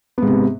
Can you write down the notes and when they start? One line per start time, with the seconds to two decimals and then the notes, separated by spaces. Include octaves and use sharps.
0.18 B3
0.22 G#2
0.27 C3